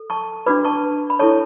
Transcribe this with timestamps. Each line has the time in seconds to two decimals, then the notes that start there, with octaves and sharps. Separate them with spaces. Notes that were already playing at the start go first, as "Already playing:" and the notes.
Already playing: A4
0.10 A5 C#6
0.46 D4 F#4 B4 B5 D6
0.65 A5 C#6
1.10 B5
1.19 E4 A4 C#5 A5 C#6